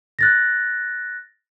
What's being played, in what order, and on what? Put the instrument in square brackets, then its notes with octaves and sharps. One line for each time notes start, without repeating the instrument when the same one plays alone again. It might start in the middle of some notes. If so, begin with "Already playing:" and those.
[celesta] F#6 A6 A#6